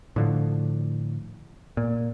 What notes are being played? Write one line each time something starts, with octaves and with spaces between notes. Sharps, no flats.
A2 D3 F3
A#2